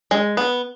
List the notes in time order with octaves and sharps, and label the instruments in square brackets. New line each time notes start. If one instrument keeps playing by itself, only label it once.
[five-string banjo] G#3
B3